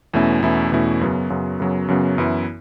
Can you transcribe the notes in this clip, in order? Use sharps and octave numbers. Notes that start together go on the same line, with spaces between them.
E2 B2 A3 C#4 E4
E2 B2 A3 C#4 E4
E2 B2 A3 C#4 E4
F#2 C#3 F#3 B3
F#2 C#3 F#3 B3
F#2 C#3 F#3 B3
F#2 C#3 F#3 B3
F#2 E3 B3 E4